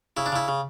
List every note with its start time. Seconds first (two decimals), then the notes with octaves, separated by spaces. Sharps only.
0.17 C#3 E4
0.26 D4
0.32 C#3 E4
0.48 C#3